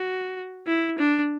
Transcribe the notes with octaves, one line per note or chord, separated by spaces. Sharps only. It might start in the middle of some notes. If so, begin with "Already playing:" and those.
Already playing: F#4
E4
D4